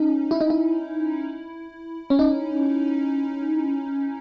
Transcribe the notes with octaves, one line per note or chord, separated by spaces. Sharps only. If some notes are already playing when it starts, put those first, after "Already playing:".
Already playing: C#4 D#4
E4
D#4
E4
C#4
D#4